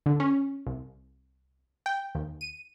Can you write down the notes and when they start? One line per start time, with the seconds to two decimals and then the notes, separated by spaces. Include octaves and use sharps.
0.06 D3
0.20 C#4
0.67 C2
1.86 G5
2.15 D#2
2.41 D#7